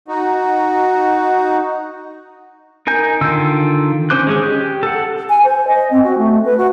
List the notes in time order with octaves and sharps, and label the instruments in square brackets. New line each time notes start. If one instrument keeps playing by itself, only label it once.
[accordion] D#4 F#4
[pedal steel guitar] D#4 A#4 G#5 G6
D3 D#3 F4 E6
C#4 C5 D6 F#6
G#3 C#4 G#4
G4
A4 F#5
[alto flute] G#5
C5
D#5
C4
F#4
A3
B4
F#4